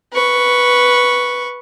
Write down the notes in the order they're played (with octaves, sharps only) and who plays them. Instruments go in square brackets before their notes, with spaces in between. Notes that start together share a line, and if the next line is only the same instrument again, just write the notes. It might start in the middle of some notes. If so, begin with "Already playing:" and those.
[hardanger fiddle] B4 C#6